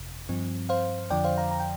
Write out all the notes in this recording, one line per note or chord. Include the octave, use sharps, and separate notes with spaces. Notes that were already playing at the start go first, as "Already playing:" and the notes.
Already playing: G1 F2 C3
G2 F3 C4
C5 F5
F2 D3 F3 D5 G5
C5 F5
F5 A#5
A#5
G5